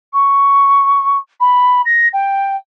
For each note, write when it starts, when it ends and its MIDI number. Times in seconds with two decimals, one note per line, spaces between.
0.13 1.18 85
1.40 1.82 83
1.85 2.08 94
2.13 2.56 79